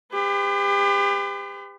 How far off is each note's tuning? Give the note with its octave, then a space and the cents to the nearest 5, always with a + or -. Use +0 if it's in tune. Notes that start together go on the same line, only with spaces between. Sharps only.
G4 +35 B4 +45